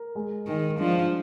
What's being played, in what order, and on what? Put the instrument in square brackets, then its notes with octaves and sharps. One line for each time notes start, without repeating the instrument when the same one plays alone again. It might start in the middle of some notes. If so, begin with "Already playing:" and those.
Already playing: [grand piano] A#4
G#3
[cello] D#3 [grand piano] G#3
[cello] F3 [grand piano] D4